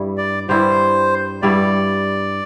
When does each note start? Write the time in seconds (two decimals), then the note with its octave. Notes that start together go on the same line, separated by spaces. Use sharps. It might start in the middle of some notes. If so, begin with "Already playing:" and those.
Already playing: G2 G3 E4
0.18 D5
0.49 G2 G3 E4 C5
1.42 G2 G3 E4 D5